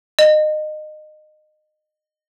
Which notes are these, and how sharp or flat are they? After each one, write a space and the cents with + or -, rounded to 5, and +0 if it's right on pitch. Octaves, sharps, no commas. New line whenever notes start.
D#5 -25